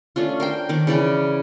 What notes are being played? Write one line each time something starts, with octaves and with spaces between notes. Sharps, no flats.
A3 C#4 D4 F4
A#4 C5 G5
D#3 D4 D6
C#3 E3 D5